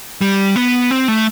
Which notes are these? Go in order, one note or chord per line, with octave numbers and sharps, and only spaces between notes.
G3
B3
C4
A3